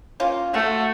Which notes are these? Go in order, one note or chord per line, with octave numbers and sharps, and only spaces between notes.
A#3 C#4 F4
A3 F#4